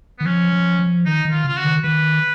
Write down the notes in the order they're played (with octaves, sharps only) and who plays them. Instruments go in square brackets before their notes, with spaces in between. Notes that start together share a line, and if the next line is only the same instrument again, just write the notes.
[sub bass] D#3 [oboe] B3
[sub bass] F3 [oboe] C#4
[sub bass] F3
F3
[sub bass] D#3 [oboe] D#4
[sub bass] D#3
[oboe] F4
[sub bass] C#3 [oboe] F4
[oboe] F#4
[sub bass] D#3
[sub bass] D#3 [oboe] B4